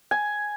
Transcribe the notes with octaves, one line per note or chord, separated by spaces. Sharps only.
G#5